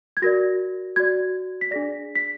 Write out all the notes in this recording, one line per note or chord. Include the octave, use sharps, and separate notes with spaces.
G#6
F#4 A#4 D5 A#6
F#4 D5 G#6
B6
D4 G#4 D5 A#6
B6